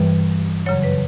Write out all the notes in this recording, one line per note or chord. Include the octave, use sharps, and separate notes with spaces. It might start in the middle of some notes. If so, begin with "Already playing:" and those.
Already playing: G2 E3 G3 B4
F#2 C#3 F#3 C#5
B4